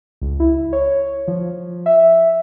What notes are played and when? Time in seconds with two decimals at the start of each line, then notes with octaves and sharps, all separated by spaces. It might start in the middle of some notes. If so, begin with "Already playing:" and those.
0.22 C#2
0.40 E4
0.73 C#5
1.28 F3
1.86 E5